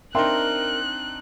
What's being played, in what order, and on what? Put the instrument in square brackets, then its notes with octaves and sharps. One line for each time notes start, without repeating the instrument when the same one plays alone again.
[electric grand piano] C4 D4 D#4 [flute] A#4 [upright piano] E5 G5 C6 [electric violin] F#6